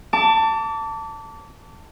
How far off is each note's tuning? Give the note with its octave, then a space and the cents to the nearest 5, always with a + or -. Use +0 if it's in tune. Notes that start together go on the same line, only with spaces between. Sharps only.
A5 +20 D6 -30